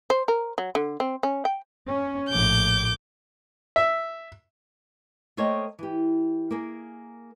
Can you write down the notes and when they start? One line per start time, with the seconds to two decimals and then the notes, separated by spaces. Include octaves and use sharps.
0.10 C5
0.28 A#4
0.58 F#3
0.75 D3
1.00 C4
1.23 C#4
1.45 G5
1.87 C#4
2.29 A#1 A2 D6 G6
3.76 E5
5.37 A3 A#3 C5 C#5 D#5 G5
5.79 E3 G4
6.51 A#3 G#4 A#4